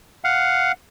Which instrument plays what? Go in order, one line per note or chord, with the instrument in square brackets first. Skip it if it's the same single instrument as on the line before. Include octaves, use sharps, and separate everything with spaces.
[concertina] F5 F#5